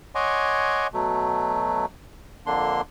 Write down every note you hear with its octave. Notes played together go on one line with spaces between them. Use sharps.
C#5 D#5 F#5 G#5 C6 D6
B2 F#3 A3
F2 D3 A#3 D4 C6